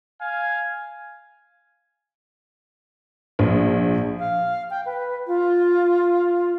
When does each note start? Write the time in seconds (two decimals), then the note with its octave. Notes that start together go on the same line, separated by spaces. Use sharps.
0.21 F5 G#5
3.39 A#1
4.19 F5
4.70 G5
4.86 B4
5.27 F4